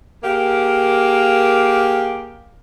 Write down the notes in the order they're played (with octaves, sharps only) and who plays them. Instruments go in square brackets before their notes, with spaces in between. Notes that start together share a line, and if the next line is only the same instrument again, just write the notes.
[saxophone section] A#3 G4 G#4 A#4 F5